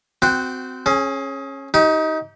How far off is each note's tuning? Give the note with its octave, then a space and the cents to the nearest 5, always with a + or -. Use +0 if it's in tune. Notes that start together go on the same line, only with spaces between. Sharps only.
C4 -25 F#4 +0 G5 +0
C#4 -20 G#4 +20
D#4 +20 G4 -20